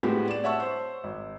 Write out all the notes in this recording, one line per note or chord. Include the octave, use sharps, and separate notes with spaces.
A2 G#3 B3 C4 F#4 G4
D5 E7
C#5 E5 F#5 A5 C#6 E6
C5
G#1